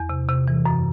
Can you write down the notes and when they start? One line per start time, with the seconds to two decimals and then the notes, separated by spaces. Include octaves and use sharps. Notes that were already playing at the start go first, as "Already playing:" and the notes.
Already playing: E2
0.09 C3
0.28 C3
0.48 E3
0.66 F#2